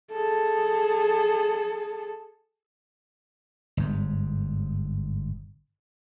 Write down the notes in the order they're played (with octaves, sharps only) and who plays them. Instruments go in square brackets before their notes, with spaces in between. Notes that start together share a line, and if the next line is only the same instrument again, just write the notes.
[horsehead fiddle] G#4 A4
[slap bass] G1 G#2